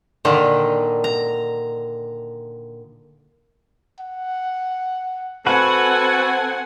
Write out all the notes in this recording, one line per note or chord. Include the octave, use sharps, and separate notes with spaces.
A#2 D3 D#3
A#5
F#5
C4 F#4 A4 B4 F#5 G#5